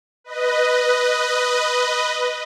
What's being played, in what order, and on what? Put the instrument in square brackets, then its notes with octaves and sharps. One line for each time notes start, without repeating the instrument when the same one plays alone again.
[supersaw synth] B4 D#5